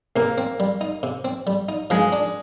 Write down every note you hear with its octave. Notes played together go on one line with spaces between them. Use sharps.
C3 A#3
C4
G3
D#4
C3
C4
G3
D#4
F3 G#3
D4